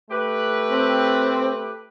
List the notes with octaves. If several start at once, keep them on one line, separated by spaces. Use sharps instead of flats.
A3 G4 B4
C4